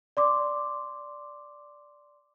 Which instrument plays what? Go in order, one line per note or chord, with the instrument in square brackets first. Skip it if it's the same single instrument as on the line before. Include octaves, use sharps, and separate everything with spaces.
[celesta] D5 C6 D6